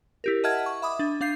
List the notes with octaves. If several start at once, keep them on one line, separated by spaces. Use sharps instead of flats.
E4 G4 A#4
D#5 E5 F#5 A5 F6 G#6
C#6
E5 B5 D6 D#6
D4
D4 F5 G6 C7